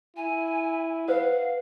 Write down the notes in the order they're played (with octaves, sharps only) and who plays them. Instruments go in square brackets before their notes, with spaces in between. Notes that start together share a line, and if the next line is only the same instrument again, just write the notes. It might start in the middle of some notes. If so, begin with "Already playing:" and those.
[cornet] E4 [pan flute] G#5
[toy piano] B4 C5 [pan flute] F5 [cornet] F#5